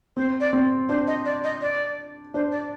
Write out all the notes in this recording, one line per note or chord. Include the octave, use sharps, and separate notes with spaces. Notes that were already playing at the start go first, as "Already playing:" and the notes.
C4 C5
D5
C4
D4 C5
D#5
D5
D#5
D5
D4 C5
D5